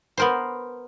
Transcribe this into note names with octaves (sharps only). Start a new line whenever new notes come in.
B3 A#4 C5